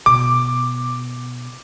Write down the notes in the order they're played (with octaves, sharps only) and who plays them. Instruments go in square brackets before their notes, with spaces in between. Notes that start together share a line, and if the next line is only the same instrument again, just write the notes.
[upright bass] B2 [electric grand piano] D6